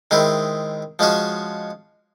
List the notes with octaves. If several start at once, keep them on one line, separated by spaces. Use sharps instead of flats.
D#3 G#3 C4 E4
F3 G#3 C#4 F#4